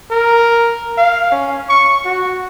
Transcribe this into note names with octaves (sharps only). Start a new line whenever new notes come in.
A#4
F5
C#4
C#6
F#4